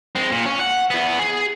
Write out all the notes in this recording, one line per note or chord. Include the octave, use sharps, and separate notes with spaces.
G#3 C4
A#2
C#4
F#5
E2 B3
G#4